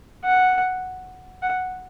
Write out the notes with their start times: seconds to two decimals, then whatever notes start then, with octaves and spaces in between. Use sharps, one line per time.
0.25 F#5
1.42 F#5